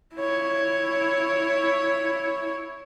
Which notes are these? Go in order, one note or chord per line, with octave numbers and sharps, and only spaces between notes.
E4 C#5